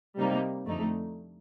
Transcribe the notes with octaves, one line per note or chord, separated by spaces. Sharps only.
C3 G3 A#3 D#4
F2 D3 A3 D#4